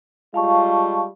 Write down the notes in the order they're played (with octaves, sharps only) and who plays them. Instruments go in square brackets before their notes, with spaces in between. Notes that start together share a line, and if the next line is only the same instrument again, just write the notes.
[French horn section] G3 G#3 F4 [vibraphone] F5 A5 C#6